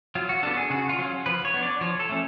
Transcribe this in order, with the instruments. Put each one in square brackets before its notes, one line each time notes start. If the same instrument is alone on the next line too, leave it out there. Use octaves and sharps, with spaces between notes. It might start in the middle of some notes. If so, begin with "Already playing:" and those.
[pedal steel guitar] F#3 F4
F#4
B3 D4 A4
G#4
C#3 F#4
F4
F#3 C#4
F3 B4
C#5
B3 D4
D5
F3 C#5
A4
A3 C#4